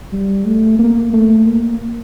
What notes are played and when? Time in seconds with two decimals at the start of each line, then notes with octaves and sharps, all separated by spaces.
0.12 G3
0.45 A3
0.79 A#3
1.13 A3
1.46 A#3